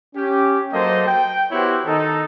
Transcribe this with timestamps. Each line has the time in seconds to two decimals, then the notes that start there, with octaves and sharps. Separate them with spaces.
0.15 C#4 G4
0.73 F#3 A#3 A4 C5 D#5
1.07 G5
1.51 B3 E4 F#4 G4 C5 C#5
1.85 D#3 D#4 A4